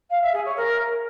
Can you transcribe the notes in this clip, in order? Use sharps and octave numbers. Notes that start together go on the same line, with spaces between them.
F5
E5
G#4
C#5
A#4